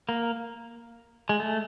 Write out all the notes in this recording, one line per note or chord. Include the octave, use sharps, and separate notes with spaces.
A#3
G#3
A3